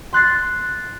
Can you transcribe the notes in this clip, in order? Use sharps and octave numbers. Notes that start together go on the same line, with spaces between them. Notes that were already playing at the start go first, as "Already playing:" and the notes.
C6 F#6 A6 C7